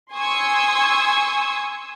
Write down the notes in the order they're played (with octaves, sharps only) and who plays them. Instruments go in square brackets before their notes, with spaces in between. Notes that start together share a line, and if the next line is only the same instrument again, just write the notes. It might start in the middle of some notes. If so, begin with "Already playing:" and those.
[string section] G#5 C6 C#6 D#6 E6 G#6